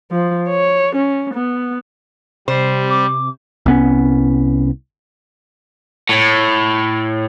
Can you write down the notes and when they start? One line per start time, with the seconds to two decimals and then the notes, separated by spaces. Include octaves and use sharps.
0.12 F3
0.50 C#5
0.96 C#4
1.34 B3
2.48 C3 G3 C5
2.89 D6
3.66 C2 B3 C#4
6.09 A2